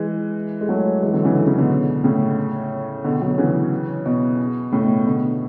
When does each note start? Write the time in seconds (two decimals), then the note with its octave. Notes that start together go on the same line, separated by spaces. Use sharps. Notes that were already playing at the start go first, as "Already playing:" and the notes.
Already playing: E3 G#3
0.61 G#3
0.69 F#3 A3
1.02 E3 G#3
1.13 D3 F#3
1.25 C#3 E3
1.36 D3
1.47 C#3
1.58 B2 D3
2.04 A2 C#3
3.04 B2 D3
3.21 D3 F#3
3.38 C#3 E3
4.06 B2
4.72 A2 C#3
4.84 B2
5.06 B2 D3